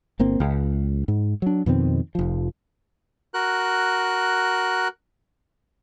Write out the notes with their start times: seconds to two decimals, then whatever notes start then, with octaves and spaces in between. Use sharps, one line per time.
0.19 G1 A#3 C4
0.40 C#2
1.08 G#2
1.42 F#3 D4
1.66 F2 B2 D#3 C4
2.15 F1 F3
3.34 F#4 A#4 F#6